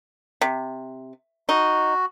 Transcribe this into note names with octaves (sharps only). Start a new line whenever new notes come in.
C3
D#4 F#4